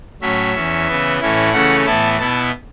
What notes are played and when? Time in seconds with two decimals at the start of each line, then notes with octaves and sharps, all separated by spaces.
0.21 A2 F#3 C#4 E5
0.54 E2 E3 C#4
0.87 C#3 E3 B3
1.20 A2 E3 C#4 E4
1.53 C#3 E3 A3 C#4 F#5
1.86 A2 E3 B3 E4 A5
2.19 B2 B3 E4 A5